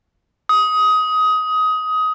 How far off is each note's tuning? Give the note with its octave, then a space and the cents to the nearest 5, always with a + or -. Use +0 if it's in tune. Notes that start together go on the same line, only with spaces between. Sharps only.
D#6 +20